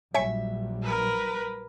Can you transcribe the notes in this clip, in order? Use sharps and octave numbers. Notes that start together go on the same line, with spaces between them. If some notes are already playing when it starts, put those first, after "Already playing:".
A#1 F#3 G3 C#5 E5 G#5 C#6
A#4 B4